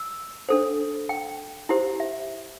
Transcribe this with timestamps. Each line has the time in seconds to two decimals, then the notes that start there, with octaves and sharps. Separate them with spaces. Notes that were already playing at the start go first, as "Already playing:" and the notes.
Already playing: E6
0.49 D4 A4 C5
1.09 G5
1.69 E4 G4 C5
2.00 E5